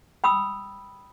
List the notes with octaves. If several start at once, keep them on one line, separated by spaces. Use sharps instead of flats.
G5 B5 D#6 E6